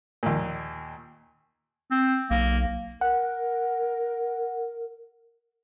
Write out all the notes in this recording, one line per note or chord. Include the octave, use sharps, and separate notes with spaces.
D#2 A#2
C4
B1 A#3
A#4 F#5